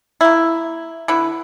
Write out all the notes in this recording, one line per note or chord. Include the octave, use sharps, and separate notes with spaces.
A#3 E4
D3 E4 B4